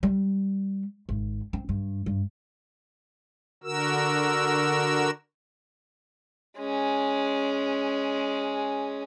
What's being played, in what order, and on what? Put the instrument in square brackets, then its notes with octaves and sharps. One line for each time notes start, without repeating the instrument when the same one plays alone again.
[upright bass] G3
G#1
C4
G2
G2
[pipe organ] D3 F#4 A#4 E6
[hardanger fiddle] G#3 C#4